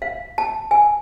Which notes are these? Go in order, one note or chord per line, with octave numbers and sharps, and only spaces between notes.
F5
A5
G#5